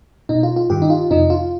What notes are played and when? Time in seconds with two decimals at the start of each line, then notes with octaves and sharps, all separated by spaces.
0.29 B2 D#4
0.43 F4
0.56 F4
0.70 G2 D#3 G4
0.82 D#4
0.90 F4
1.10 F2 C3 F3 D#4
1.30 F4